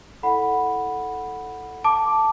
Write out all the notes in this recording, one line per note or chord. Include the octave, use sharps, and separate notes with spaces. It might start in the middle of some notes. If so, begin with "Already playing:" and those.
E4 A4 D5 F#5 B5
A5 D6